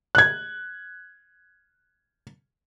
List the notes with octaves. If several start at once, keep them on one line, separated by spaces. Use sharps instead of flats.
F#6 G#6